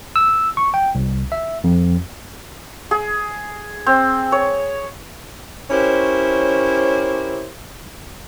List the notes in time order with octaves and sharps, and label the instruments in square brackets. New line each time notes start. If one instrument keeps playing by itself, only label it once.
[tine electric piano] E6
C#6
G5
C2
E5
F2
[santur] G#4
C4
C#5
[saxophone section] C#4 E4 G4 A#4 C5 C#5